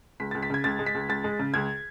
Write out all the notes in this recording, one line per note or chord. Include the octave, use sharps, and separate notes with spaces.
C#2 B6
C#2 A6
B6
C#3 G#6
C#2 A6
G#3
B6
C#2
C#2 A6
G#3
C#3
C#2 G#6